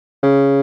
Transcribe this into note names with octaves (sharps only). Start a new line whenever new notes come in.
C#3